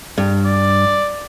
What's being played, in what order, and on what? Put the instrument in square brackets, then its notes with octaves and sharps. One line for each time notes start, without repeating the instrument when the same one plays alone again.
[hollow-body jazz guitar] G2
[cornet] D5